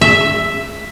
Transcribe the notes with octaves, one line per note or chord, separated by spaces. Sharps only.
E5